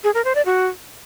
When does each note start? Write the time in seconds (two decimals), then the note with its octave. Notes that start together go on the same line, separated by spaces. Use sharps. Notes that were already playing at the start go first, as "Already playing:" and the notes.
0.04 G#4
0.14 A#4
0.25 C5
0.35 D5
0.46 F#4